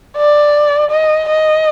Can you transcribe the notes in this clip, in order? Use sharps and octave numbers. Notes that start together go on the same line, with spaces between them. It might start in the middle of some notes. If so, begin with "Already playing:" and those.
D5
D#5
D#5